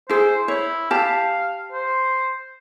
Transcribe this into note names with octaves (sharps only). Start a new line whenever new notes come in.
E4 G#4 C5
E4 C#5
G4 F5 A5
C5